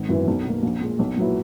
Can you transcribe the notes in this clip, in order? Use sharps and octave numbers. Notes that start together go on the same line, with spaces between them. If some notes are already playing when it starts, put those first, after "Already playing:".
Already playing: G#1
F#2 E3 B3
B1
B2 A#3
A#1
A#2 G#3
B1
A#2 F#3 B3 E4